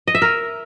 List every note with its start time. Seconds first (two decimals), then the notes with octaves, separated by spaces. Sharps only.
0.07 D#5
0.15 E5
0.22 A#4